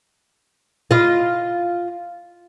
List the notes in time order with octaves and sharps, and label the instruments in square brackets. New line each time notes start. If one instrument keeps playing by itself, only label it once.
[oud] F4 D#5